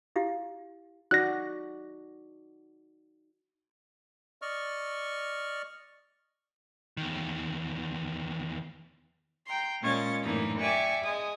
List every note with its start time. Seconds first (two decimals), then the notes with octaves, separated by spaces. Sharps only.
0.16 E4 G4 F5
1.11 D#4 F#4 D5 F#6 A#6
4.42 D5 D#5 C#6 F6
6.97 E2 D#3
9.46 G5 A#5 C6
9.81 A#2 G#3 C#4 C#5 D#5 A6
10.23 F#2 A2 E3 A#3 D4 D#4
10.59 G4 D5 E5 G#5 C#6
11.04 G#3 G#5 D#6